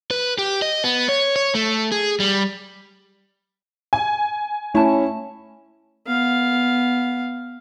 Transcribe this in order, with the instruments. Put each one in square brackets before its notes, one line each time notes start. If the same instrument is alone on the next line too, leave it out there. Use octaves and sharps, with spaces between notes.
[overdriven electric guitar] B4
G4
D#5
B3
C#5
C#5
A3
G#4
G3
[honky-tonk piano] G#5
[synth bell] A3 A5 [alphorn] C#4 [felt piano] E4
[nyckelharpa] B3 F5